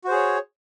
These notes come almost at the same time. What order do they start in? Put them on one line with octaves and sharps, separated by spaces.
F#4 C5 G#4 C#5